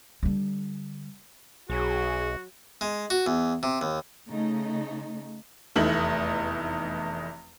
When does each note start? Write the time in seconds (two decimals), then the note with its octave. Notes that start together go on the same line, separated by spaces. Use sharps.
0.23 D3 G3
1.70 B1 F#3 F#4 G#4
2.81 G#3
3.10 F#4
3.26 E2
3.63 C3
3.81 D#2
4.30 C#3 A3 D#4
5.76 F1 E2 A3 D#4 F#7